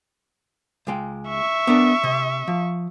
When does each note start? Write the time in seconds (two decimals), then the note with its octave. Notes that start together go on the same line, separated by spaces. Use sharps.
0.87 C#2 G#3 G5
1.29 E5 C#6
1.67 B3 D4 A#4
2.04 C3
2.47 F3